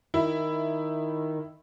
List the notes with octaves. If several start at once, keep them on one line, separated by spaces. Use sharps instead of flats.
D#3 E4